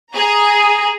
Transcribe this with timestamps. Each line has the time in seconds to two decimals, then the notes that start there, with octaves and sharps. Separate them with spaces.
0.13 G#4 A#5